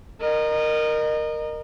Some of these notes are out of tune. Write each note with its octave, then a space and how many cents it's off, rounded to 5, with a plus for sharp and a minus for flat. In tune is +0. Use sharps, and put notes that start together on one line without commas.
A#4 +0 D#5 -30